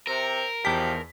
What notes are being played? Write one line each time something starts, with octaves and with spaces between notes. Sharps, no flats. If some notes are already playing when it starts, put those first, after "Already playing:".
C3 C4 A#4
E2 B2 D#3 F3 G4 A5 B6